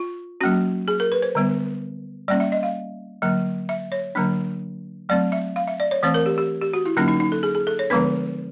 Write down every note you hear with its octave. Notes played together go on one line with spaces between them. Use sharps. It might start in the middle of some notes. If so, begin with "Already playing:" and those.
Already playing: F4
F#3 A#3 C#4 F#4
G#4
A#4
B4
C5
D3 G3 B3
G3 A#3 C#4 D5
E5
D#5
F5
D3 F#3 A#3
E5
C#5
D3 F#3 A#3 D4
F#3 A3 C4 D5
E5
F5
E5
D5
C#5
E3 A3 C4 C5
A#4
G4
G4
G4
F#4
E4
D3 F#3 A#3 C#4 D#4
D#4
D#4
A4
G#4
G#4
A4
C#5
D3 F3 G#3 B3 D4 B4